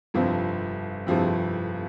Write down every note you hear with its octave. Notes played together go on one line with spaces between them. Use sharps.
G1 F2 C3 F3 C4
G1 F2 C3 F3 C4